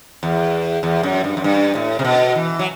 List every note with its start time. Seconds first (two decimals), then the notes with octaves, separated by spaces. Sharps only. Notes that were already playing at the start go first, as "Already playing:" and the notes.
0.23 E2
0.83 E2
1.03 F#2
1.24 G2
1.37 F#2
1.44 G2
1.75 A2
1.99 C3
2.04 B2
2.35 E3
2.59 F#3